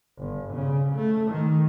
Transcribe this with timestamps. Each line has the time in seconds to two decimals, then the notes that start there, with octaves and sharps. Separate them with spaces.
0.18 G1
0.54 C#3
0.95 A3
1.31 D#3